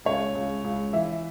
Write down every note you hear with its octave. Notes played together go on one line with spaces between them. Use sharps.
C#2 C#5
C#2
C#2
E3 E5